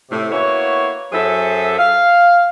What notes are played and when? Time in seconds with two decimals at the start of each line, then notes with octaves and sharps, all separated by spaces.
0.11 A2 C3 A3
0.31 A#3 B3 E4 F#4 C#5
1.13 F#2 F#3 G#4 A4 C5 E5
1.79 F5